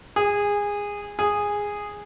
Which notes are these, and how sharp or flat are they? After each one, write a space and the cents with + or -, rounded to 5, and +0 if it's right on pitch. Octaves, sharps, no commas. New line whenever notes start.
G#4 -20
G#4 -10